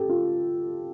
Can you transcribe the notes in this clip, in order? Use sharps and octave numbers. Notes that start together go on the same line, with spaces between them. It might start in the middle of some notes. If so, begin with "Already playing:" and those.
Already playing: G4 A4
F4